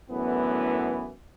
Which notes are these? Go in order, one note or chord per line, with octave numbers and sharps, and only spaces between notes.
F#2 A2 D3 E3 B3